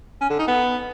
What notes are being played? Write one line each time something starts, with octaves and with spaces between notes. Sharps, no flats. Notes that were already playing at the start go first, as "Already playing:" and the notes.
C#4
D3
D#4
B3